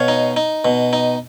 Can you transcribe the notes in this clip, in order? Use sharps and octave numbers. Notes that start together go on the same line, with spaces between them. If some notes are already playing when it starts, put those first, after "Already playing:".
Already playing: B2 C#5 F5
D#4
D#4
B2
D#4